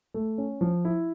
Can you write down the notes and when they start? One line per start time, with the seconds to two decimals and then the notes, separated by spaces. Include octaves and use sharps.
0.14 A3
0.38 C#4
0.61 F3
0.85 E4